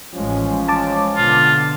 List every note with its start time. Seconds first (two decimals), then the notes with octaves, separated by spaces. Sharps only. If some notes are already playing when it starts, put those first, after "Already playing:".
0.14 A1 F3 G#3 C#4
0.68 G#3 A5 D6
1.17 B2 D3 F4